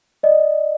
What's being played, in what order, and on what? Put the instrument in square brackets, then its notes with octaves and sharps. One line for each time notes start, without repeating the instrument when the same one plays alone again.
[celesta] D5 D#5